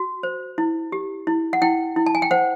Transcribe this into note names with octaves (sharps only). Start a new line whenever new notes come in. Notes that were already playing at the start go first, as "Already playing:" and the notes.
Already playing: F#4
C5
E4
G4
E4
F#5
E4 G5
E4
A5
G#5
G5
C5 F#5